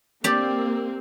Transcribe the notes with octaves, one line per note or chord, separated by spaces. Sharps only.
A#3 C4 G4 D5